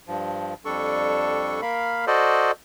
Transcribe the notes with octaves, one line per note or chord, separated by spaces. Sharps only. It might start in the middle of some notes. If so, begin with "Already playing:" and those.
G2 F3
F2 G3 D4 A4 C#6
A#3 A#4 F5 B5
F#4 A4 C5 D5 D#5